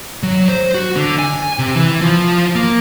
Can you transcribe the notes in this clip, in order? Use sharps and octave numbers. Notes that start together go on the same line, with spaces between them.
F#3
C5
F#4
D3
G#5
C3
E3
F3
A#3